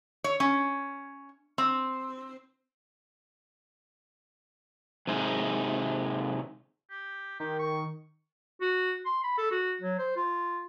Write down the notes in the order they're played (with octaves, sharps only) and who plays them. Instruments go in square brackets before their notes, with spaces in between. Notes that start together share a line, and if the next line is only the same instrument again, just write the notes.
[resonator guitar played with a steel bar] C#5
C#4
C4
[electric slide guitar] C3 G#3 D#4
[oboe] G4
[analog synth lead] D#3 [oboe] G4
[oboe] C#6
[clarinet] F#4
C6
B5
A4
F#4
F#3
C5
F4